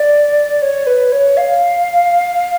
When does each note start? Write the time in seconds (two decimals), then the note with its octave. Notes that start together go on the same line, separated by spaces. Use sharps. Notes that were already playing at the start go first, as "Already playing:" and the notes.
Already playing: D5
0.62 C#5
0.87 B4
1.12 C#5
1.37 F5